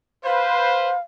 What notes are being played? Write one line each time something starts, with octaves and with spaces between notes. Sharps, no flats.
B4 C5 F5